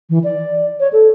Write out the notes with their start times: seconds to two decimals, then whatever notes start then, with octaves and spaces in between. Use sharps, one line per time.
0.10 E3
0.24 D5
0.80 C#5
0.93 A4